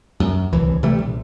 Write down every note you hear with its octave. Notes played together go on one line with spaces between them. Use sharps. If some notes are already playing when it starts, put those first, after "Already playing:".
F#2
D1 C2 E3
C3 E3 G3 A3
A#1